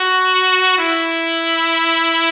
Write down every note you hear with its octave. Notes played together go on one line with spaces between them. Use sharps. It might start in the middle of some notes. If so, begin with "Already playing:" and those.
Already playing: F#4
E4